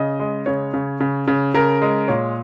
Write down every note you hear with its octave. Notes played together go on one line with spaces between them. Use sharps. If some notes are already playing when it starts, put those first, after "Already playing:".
Already playing: C#3 D#5
G#3
C#3 C#5
C#3
C#3
C#3
C#3 A#4
G#3
A#2 C#5